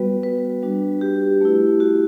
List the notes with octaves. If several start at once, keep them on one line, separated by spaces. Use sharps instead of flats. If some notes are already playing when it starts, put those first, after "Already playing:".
Already playing: G3 B3 F#4 B4
B4
G3 D4 F#4
G4
A3 E4
F#4